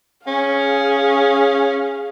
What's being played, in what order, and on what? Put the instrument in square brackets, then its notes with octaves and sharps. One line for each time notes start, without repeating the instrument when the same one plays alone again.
[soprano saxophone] C#4 [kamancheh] G#4 F5